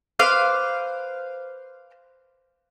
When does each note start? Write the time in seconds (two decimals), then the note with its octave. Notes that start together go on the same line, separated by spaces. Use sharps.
0.19 B4 C5 F5 D6